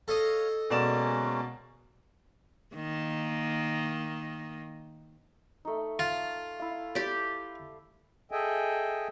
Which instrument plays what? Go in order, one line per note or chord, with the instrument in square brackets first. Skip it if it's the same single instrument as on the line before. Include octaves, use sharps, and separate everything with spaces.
[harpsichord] A4 D#5 [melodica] C#5 F5
[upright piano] B2 D5 E7 [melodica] G#3 A#3 C#4
[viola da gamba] D#3 A#3
[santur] A3 D#4
[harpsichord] F4
[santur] E4 F5
[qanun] G4 D5
[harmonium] G#4 A4 D#5 E5 G5 G#5